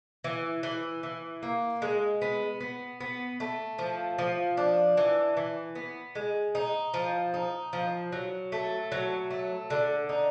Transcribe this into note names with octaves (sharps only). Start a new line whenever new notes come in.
E3
E3
E3
A#3
G#3
B3
B3
B3
A3
F3
F3
D4
E3
E3
B3
G#3
D#4
F3
D#4
F3
F#3
A3
F#3
A3
D3
D#4